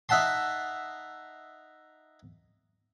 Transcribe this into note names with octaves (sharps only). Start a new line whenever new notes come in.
D#4 E5 F#5 A5 C6